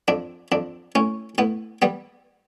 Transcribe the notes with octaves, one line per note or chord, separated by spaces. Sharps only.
F2 D4
F2 D4
A2 C#4
A2 B3
G3 B3